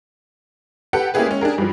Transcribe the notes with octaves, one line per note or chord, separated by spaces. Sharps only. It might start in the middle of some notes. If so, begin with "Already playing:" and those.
G4 A4 B4 F#5 G5
A#3 C#4 E4 G4 G#4 B4
G#3 C#4
D4 G4 G#4 A#4
G2 F3